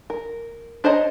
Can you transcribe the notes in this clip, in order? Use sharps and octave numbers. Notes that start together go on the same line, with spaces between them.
A#4
D4 C5 C#5 D#5 A#5